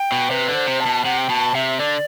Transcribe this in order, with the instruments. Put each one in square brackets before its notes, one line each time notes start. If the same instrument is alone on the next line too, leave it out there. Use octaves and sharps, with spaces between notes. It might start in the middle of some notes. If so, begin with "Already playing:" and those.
Already playing: [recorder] G5
[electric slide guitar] B2
[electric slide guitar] C3 [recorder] B4
[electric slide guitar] D3
[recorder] C5
[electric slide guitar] C3
[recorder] A5
[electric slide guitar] B2
[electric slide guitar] C3 [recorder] F#5
[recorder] G5
[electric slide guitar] B2 [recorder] A5
[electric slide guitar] C3 [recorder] E5
[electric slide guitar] D3 [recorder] D5